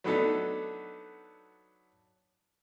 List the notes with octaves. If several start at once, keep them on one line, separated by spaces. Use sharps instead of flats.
F#3 A3 B3 D4 D#4 A4